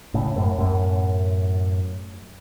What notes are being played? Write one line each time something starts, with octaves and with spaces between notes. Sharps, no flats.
A2 C#3
F#2 A2
F#2 A2